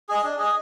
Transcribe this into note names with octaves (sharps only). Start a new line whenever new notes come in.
G#4 D#5
D4
G#4 D#5